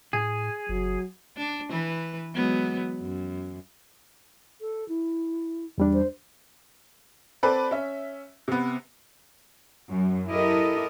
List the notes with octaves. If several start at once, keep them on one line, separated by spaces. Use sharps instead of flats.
A2 G#4
F#1 F#3
D4
E3 B4
F#3 G#3 B3
F#2
A4
E4
E2 G3 D4
C5
C4 A4 B4 D5
C#4 E5
C3 B3
F#2
E4 G4 A4 A#4 D#5